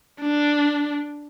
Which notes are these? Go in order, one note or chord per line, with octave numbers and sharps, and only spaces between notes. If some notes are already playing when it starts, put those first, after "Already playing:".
D4